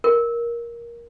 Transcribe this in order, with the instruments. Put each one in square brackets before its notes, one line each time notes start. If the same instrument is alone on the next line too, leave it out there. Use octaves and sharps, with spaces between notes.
[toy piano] A#4